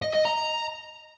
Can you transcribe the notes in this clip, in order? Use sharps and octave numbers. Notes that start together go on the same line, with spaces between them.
D#5
D#5
A#5